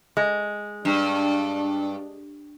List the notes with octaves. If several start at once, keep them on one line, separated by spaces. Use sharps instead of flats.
G#3
G2 D4